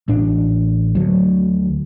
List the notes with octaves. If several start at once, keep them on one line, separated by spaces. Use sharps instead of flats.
A1 D4
D2 F#3